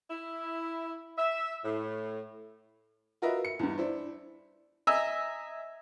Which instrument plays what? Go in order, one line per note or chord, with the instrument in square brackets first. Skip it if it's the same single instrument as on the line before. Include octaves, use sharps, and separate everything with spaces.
[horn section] E4
E5
A2
[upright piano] F4 F#4 A#4 B4 D#5 E5
C#7
E2 G2
D4 E4 C5
[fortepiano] D#5 E5 G#5 A#5